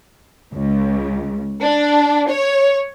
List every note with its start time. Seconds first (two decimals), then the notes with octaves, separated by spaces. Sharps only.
0.53 C#2
1.62 D4
2.30 C#5